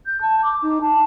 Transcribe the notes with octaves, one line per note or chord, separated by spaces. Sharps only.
G6
A5
D6
D#4
A5